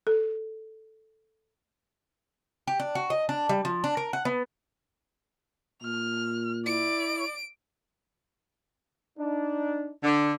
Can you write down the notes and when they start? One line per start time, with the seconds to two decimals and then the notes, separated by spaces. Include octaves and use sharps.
0.07 A4
2.67 G4
2.80 D4
2.95 F#4
3.10 D#5
3.29 D4
3.49 G3
3.65 F3
3.84 D4
3.97 A#4
4.13 F#5
4.25 B3
5.83 A#2 F6
6.66 E4 D5 D7
9.18 D4 D#4
10.03 D3